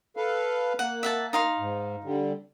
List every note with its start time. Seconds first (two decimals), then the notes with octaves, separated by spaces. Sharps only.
0.17 A4 B4 F5
0.79 A#3 F#5
1.03 E5 F#5 A5
1.33 D#4 F5 C6
1.59 G#2
2.04 D3 G3